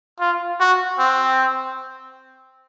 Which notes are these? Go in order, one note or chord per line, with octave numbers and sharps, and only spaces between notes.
F4
F#4
C4